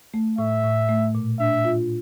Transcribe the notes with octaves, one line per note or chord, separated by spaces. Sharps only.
A3
A2 E5
A2
A3
A#2
D4 E5
F4